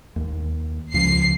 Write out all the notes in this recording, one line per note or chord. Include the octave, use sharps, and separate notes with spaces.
D#2
C#2 C#3 F3 C7